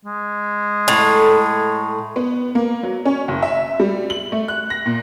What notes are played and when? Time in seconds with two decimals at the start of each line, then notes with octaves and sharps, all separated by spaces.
0.05 G#3
0.88 A2
2.16 B3
2.55 A#3
2.83 F#3
3.05 C#4
3.28 F#1
3.42 E5
3.80 G3
4.10 F#7
4.32 A3
4.48 F#6
4.70 A#6
4.86 A#2